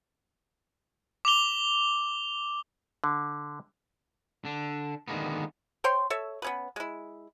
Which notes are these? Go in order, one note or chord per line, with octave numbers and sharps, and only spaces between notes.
D6 F7 G7
D3
D3 D4
D3 D#3 F#3 G#3 A#3 B3
C5 C#5 G5 C6
A4 C#5 E5
B3 C#4 B4
G#3 E4